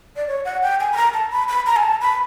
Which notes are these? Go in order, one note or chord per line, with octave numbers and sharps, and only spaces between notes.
D5
C#5
F#5
G5
G#5
B5
A#5
A5
B5
B5
A#5
G#5
A5
B5